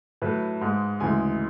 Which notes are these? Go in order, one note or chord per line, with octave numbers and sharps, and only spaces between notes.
A2 F#3 B4
G#2 G#3
D2 C#3 E3 G#3 G#5